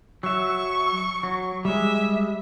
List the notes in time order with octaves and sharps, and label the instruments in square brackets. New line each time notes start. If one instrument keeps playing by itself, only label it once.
[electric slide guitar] F#3 E5 [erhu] C#6
[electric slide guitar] F#3
[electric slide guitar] G3 G#3 [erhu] E5